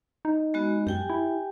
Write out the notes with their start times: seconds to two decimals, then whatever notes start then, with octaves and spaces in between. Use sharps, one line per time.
0.25 D#4
0.54 G#3 B3 F#4
0.87 F#2 G4 G5 G#5
1.10 E4